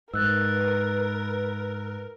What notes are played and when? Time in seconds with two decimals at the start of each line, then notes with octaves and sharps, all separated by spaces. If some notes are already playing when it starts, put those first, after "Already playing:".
0.13 G#2 A#4 B4 E6 F#6 A6